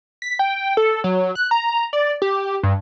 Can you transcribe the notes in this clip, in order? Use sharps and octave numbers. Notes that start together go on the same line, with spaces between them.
B6
G5
A4
F#3
F#6
A#5
D5
G4
G2